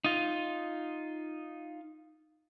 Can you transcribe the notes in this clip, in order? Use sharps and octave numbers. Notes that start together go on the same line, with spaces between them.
D#4 F4